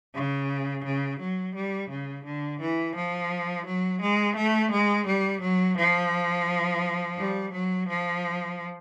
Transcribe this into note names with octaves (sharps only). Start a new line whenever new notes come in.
C#3
C#3
F#3
G3
C#3
D3
E3
F3
F#3
G#3
A3
G#3
G3
F#3
F3
G3
F#3
F3